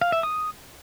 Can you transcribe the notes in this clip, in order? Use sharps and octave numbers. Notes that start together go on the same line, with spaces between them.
F5
E5
D#6